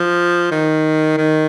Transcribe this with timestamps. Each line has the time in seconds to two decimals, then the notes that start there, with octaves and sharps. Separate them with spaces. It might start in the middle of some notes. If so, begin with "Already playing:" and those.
Already playing: F3
0.51 D#3
1.17 D#3